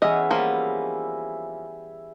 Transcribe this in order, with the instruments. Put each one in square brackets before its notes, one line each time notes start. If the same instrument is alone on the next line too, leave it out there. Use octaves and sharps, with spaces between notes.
[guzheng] E3 B3 C#4 [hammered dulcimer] G#4 E5 [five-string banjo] D#5
[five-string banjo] F3 A#3 [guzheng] G3 B3